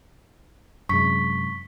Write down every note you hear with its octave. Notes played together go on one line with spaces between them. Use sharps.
F#2 C3 G#3 C#6 B6